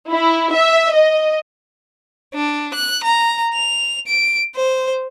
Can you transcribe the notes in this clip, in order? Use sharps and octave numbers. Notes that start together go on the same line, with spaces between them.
E4
E5
D#5
D4
F#6
A#5
F7
D7
C5